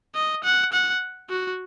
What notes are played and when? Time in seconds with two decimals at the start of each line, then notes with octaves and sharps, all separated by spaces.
0.15 D#5
0.44 F#5
0.72 F#5
1.29 F#4